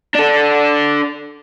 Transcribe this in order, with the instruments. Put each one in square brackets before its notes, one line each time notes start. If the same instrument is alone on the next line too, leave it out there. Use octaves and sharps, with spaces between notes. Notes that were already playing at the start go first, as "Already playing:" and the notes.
[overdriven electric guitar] D4 A4